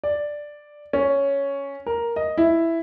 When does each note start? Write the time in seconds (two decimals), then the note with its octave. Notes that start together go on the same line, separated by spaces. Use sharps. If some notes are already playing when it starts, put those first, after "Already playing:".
0.04 D5
0.93 C#4
1.86 A#4
2.16 D#5
2.38 E4